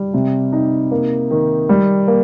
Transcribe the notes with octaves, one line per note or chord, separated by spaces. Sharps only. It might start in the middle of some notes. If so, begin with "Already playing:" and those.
Already playing: G3
C3
D#4
A#3
D#3
G3
A#3